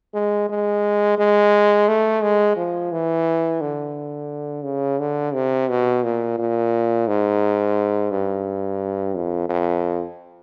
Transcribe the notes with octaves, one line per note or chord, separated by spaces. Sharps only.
G#3
G#3
G#3
A3
G#3
F3
E3
D3
C#3
D3
C3
B2
A#2
A#2
G#2
G2
F2
F2